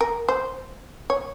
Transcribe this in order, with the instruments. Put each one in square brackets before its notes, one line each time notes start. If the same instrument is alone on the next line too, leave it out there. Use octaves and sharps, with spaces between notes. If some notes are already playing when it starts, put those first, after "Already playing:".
[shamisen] A#4
C5
C#5